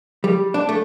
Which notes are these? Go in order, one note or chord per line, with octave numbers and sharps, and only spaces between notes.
G3
D4
A3